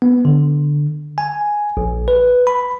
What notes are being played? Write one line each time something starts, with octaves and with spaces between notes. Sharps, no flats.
B3
D3
G#5
A#1
B4
B5